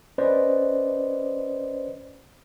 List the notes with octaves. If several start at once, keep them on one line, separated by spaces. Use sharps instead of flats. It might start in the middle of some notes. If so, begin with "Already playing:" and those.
C#4 B4 C5 D5 D#5